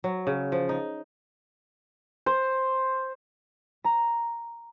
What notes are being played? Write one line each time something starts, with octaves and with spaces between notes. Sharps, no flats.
F#3
C#3
F3
D#4
C5
A#5